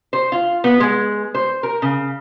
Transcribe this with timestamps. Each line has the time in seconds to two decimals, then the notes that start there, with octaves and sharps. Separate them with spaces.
0.13 C5
0.32 F4
0.64 B3
0.80 G#3
1.35 C5
1.63 A#4
1.82 C#3